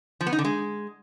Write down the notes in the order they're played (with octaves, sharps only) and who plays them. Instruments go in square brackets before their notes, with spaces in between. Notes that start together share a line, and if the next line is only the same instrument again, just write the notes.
[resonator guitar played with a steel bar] F3
B3
D#4
D3
G#3